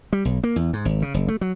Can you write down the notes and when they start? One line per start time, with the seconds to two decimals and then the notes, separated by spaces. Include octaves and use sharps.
0.13 G3
0.25 B1
0.44 A#3
0.56 E2
0.73 G#2
0.85 G#1
1.02 C#3
1.14 F#1
1.28 A3
1.41 F#3